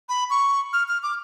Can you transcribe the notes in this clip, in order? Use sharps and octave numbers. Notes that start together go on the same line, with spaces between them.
B5
C#6
F6
F6
D6